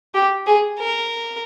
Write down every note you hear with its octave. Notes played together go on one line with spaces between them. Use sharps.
G4
G#4
A#4